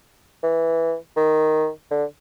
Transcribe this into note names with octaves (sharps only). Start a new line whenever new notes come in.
E3
D#3
D3